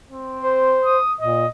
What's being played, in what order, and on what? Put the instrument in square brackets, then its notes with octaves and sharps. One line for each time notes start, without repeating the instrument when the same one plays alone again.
[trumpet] C4
[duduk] C5
[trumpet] D#6
[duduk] A#2 [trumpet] D#5